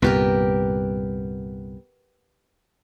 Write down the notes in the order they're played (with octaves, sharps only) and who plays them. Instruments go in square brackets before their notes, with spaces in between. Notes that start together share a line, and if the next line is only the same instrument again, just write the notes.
[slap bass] C2 G2 A#2 [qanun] B3 G4 A#4